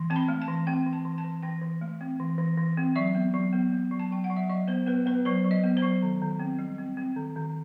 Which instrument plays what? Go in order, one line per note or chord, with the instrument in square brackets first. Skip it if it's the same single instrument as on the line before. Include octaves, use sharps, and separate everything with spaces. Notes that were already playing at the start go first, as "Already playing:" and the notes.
Already playing: [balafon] E3
C4 A5
B5
A3
A5
E3
C4 G5
E3
A5
E3
A5
E3
E3 G5
E3
A3
C4
E3
E3
E3
C4
F#3 E5
B3
F#3
B3
B3
F#3
A5
F#3 G5
F#5
F#3
E5
F#3 D#5
B3 C5
B3 B4
B3 B4
F#3 C5
F#3
D#5
B3
C5
F#3
D#3
D#3
C4
G3
C4
C4
D#3
D#3